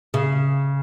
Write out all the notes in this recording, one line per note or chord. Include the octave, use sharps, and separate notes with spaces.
C#3